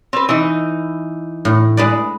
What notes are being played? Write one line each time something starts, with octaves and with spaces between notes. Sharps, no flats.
C4 B4
E3 D#4
A2
G#3 B4 D5